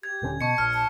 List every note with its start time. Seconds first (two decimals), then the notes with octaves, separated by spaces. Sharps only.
0.03 G4 G#6
0.22 D#1 D3 C#4
0.41 B2 A5 C#6 C#7
0.58 A#1 F6
0.74 A5